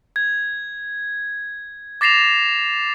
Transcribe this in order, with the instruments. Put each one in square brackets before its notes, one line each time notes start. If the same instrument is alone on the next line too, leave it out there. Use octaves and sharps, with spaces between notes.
[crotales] G#6
D6 A6 A#6 C7 E7 F7